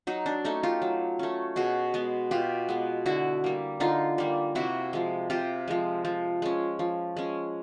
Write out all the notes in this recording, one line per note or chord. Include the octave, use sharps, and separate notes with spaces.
F#3 D#4
D4
A3 C#4 D#4
F4 G4
F#3
A3 C#4
B2 F#4 G#4
G#3 B3
B2 F4 G4
G#3 B3
D3 E4 F#4
G3 A#3
D3 D#4 F4
G3 A#3
C3 E4 F#4
F3 G#3
C3 F4 G4
F3 G#3
F3
G#3 C#4
F3
G#3 C#4